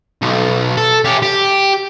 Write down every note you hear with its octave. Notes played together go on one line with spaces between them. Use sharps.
B1
A4
C#4 G4
G4